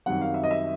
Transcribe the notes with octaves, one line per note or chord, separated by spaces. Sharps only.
F#2 D#3 G3 C4 F#5
F5
E5
D#5
E5